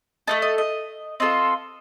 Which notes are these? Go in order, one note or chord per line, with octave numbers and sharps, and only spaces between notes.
A3 D#4 A4 D#5
D#5
D#5
C4 F4 A4 D#5